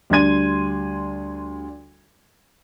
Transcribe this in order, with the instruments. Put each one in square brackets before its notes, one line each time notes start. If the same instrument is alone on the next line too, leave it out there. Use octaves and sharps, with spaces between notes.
[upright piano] D2 G3 D4 C6 G#6 D#7